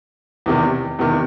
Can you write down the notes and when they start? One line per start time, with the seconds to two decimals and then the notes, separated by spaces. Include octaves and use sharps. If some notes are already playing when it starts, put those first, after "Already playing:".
0.46 E2 C3 D#3
0.99 E2 C3 D#3